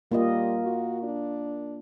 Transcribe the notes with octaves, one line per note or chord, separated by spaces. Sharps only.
G3 A#3 F4 D#5
F#4
D4